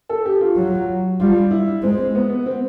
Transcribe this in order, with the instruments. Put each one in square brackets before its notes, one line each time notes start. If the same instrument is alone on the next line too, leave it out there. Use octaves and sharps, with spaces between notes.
[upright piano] A4
G4
F4
[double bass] F#3
[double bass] G3 [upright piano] F4
[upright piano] E4
[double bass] G#3 [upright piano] C4
[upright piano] B3
B3
C4